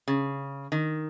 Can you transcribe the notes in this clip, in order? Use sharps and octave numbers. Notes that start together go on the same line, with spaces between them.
C#3
D#3